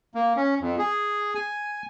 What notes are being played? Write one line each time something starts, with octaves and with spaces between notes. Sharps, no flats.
A#3
C#4
F2
G#4
G#5